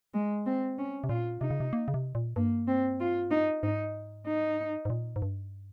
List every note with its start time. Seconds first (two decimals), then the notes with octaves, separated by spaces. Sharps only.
0.14 G#3
0.46 C4
0.78 C#4
1.04 C3
1.09 A#2 F4
1.41 C3 D#4
1.50 C#3
1.60 C3
1.73 A#3
1.88 C#3
1.94 C3
2.15 A#2
2.36 G2 A#3
2.67 C4
3.00 F4
3.31 D#4
3.63 G#2 D#4
4.27 D#4
4.85 G#2
4.90 A#2
5.16 G#2
5.22 G2